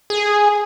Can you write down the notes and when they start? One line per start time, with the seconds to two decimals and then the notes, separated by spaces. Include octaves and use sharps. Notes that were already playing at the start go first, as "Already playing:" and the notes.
0.10 G#4